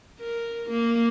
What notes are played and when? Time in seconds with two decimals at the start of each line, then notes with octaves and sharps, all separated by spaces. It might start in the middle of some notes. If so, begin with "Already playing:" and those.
0.20 A#4
0.70 A#3